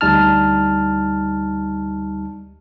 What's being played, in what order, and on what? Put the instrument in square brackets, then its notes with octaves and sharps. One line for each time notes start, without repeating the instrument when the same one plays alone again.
[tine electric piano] D2 G3 D#4 A5 F6